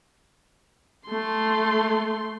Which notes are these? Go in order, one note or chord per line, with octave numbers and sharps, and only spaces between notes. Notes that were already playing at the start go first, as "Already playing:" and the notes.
A3 C6